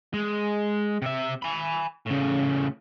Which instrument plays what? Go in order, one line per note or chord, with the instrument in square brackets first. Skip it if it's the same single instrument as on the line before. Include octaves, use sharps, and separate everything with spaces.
[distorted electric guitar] G#3
C3 E5
G#5 B5
A2 C#3